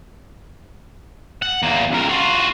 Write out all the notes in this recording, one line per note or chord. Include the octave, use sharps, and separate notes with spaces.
F#5
E2 A#3
C#2 A#4
F4 F#4